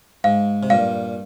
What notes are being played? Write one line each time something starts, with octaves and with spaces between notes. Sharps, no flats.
G#2 F5
C3
G2 A#2 F5